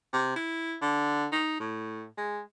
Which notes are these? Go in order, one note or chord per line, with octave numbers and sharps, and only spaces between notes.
C3
E4
D3
D#4
A2
G#3